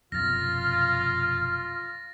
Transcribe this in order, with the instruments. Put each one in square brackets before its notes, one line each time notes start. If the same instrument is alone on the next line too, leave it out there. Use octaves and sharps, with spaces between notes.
[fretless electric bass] F1 F#2 B2 [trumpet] F4 [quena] F6 [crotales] A6 A#6